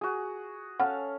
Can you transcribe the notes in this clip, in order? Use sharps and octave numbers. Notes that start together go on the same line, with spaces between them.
F#4 G#4
C#4 A4 F5 F#5